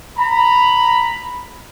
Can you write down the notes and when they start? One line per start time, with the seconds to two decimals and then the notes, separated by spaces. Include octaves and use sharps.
0.18 A#5 B5